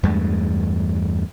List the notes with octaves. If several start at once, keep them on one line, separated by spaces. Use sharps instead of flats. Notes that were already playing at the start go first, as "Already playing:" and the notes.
E2 G2 G#3 A3